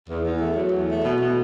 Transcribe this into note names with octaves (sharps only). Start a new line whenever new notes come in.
E2
E2
A3
F#3
E2
A3
B2
B2